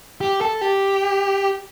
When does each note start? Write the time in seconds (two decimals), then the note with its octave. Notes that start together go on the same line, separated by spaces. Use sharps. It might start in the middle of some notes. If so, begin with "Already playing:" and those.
0.21 G4
0.41 A4
0.61 G4